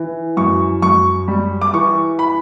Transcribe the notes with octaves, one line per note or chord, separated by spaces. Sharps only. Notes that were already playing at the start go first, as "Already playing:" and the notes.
Already playing: E3
F#2 C#6
F#2 C#6
G3
D6
E3 C#6
B5